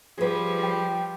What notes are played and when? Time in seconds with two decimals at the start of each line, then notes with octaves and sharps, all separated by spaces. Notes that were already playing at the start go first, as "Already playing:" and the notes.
0.18 F3 G3 G#4 B4
0.63 G5